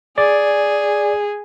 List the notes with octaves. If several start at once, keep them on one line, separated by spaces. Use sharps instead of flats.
G#4 D5